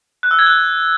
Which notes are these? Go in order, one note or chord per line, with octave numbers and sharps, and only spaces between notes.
F#6
E6
G#6
F#6